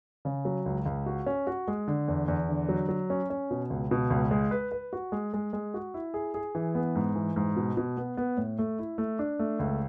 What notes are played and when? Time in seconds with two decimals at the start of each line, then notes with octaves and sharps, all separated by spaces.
0.25 C#3
0.45 F#3
0.66 C#2
0.86 C#2
1.06 F#4
1.26 C#4
1.47 F#4
1.68 G#3
1.88 D3
2.08 E2
2.28 E2
2.48 D3
2.69 F#3
2.89 F#3
3.10 C#4
3.30 C#4
3.51 B2
3.70 C#2
3.91 B2
4.10 C#2
4.31 G#3
4.51 B4
4.72 B4
4.93 F#4
5.12 G#3
5.33 G#3
5.53 G#3
5.74 F#4
5.94 E4
6.14 G#4
6.34 G#4
6.55 E3
6.75 B3
6.95 G#2
7.16 E3
7.36 G#2
7.56 B2
7.77 B2
7.97 B3
8.17 B3
8.37 A2
8.59 A3
8.79 E4
8.98 A3
9.19 D4
9.39 A3
9.59 C#2